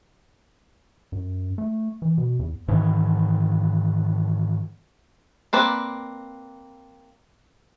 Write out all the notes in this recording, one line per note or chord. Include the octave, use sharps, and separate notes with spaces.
F#2
A3
E3
B2
E2
G#2 D#3 E3
A#3 C4 B4 D5